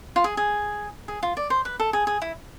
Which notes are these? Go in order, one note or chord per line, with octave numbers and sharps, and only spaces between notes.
F4
G#4
G#4
G#4
F4
D5
C5
B4
A4
G#4
G#4
E4